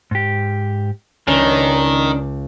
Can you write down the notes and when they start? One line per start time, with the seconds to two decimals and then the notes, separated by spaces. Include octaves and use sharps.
0.11 G#2 G4
1.28 C#2 D#3 C#4 D4